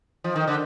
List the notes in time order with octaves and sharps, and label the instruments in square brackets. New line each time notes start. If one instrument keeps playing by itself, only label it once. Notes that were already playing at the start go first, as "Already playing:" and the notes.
[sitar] F3 [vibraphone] C5 D#5
[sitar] D#3 [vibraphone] A4 C5
[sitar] D3 [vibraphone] A#4 D5